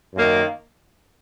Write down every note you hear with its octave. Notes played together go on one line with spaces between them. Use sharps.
F#2 D#3 A#3